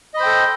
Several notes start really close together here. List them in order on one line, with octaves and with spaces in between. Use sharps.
D#5 B5 C5 G5 A4